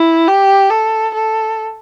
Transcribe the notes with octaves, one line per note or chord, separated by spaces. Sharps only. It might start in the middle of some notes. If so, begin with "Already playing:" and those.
Already playing: E4
G4
A4
A4